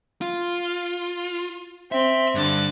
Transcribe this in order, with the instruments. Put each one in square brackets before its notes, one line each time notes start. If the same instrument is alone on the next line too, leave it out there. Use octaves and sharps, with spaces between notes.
[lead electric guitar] F4
[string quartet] C4 [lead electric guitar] E5
[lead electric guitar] G2 [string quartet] D3 F#6 A6